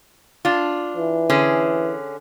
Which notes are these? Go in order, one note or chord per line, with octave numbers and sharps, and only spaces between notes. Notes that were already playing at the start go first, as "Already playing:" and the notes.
D4 F4
E3
D3 C#4 G#4